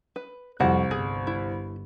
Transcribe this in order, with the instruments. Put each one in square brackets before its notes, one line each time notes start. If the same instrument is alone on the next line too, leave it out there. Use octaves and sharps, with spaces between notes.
[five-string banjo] B4
[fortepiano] C2 [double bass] F2 [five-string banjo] F#4 F#5 A5
[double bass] G1 [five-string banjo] G#4
[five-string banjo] E4